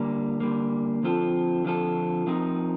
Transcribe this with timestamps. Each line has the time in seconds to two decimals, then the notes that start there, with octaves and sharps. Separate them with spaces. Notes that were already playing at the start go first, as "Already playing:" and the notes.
Already playing: D3 G3 A#3
0.40 D3 G3 A#3
1.03 D3 F3 C4 F4 A4
1.65 D3 F3 C4 F4 A4
2.27 F3 C4 D#4 A#4